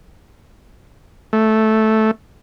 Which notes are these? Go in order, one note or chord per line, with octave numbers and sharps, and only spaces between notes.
A3